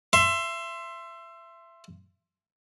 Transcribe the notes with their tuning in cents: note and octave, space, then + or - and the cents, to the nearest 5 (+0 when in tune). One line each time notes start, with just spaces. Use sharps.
E5 +25 C6 +5